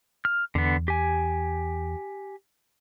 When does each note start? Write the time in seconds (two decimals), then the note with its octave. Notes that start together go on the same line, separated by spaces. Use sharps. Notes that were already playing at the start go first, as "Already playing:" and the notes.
0.25 F6
0.55 E2 D3 B3
0.88 G4 G#5